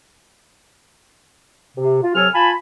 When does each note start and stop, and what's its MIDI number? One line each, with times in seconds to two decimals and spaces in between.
1.77 2.00 48
2.02 2.14 65
2.15 2.28 48
2.15 2.28 54
2.15 2.28 69
2.15 2.28 80
2.15 2.28 89
2.35 2.51 65
2.35 2.51 80
2.35 2.51 81
2.35 2.51 83